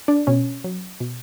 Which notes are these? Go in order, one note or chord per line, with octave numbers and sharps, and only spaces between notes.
D4 D5
B2 C#4 C#5
F#3
B2